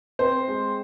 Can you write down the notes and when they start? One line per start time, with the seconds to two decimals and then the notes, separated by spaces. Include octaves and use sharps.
0.19 C4 C5
0.48 G#3